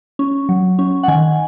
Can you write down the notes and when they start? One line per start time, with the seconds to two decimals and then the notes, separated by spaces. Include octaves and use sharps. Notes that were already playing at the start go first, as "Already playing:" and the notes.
0.19 C#4
0.49 F#3
0.79 C#4
1.03 F#5
1.08 D#3 G#5